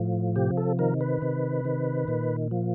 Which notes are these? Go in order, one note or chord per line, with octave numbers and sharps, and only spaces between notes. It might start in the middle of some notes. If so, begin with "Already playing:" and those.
Already playing: A2 F3
C3 G4
A4
D#3 A#4
B4
C3
D#3
A#2
F3